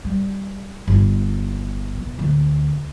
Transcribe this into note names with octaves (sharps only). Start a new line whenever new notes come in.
G3
G1
B2
D2